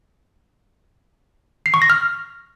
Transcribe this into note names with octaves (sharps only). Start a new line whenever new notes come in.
C7
C#6
A#6
F6